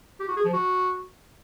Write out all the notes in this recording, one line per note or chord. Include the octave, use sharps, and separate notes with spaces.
G4
F#4
G#4
F3
F#4